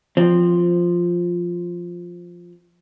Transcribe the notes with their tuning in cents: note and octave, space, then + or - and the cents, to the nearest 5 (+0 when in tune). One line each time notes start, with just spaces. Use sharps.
F3 +0 C4 +0